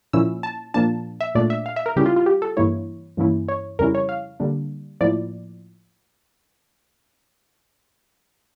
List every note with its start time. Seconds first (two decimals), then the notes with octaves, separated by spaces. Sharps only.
0.13 A#2 F3 C#4 E4 E6
0.43 A5
0.74 A#2 F3 A#3 D4 A5
1.21 E5
1.35 A#2 A3 D4 D5
1.50 E5
1.66 F5
1.76 E5
1.86 A#4
1.96 C#3 G3 C#4 E4 G4
2.06 F4
2.16 F4
2.26 G4
2.42 A4
2.57 G2 E3 A#3 E4 C#5
3.17 G2 E3 A#3 C#4 E4
3.49 C#5
3.79 F2 C#3 G3 C#4 E4 A#4
3.95 C#5
4.09 F5
4.40 D3 G3 A#3 D4
5.01 A2 F3 A#3 E4 D5